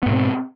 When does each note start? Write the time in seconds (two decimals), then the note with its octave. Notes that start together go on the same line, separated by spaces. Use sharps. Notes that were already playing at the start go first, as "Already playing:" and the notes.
0.03 B3
0.06 G#2
0.09 B2
0.13 C4